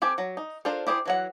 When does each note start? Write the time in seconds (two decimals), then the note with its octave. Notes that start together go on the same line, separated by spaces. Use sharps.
0.02 C4 G4 A4 G#5
0.18 F#3
0.37 D#4
0.65 D4 F4 A4 A#4 C5
0.87 E4 G4 G#4 A#4 C5
1.06 E3 F#3 F#5